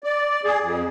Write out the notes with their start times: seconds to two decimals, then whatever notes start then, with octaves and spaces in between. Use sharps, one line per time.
0.04 D5
0.45 G#4
0.61 F2